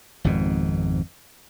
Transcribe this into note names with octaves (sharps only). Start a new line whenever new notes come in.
G#1 F2 G#2 B2